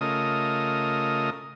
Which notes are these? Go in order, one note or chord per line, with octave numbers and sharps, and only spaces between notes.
C#3 A3 F4 A#4 D#5 D#6